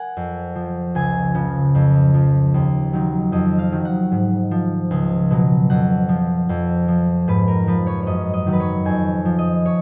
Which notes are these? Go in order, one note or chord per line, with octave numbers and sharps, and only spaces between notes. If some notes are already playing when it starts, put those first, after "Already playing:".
Already playing: A#4 F#5 G#5
F2
F3
C#2 G#5
C#3 F3
F2
F3
D#2
D#3 F#3
F2 D#5
F5
D#3 F#3
F#5
G#2
F3
C#2
B2 F#3
F2 F#5
F3
F2
F3
G#2 B4
A#4
F3 B4
C#5
F#2 C#5 D#5
D#5
D#3 F#3
B4
C#5
F2 G#5
F3
D#5
C#5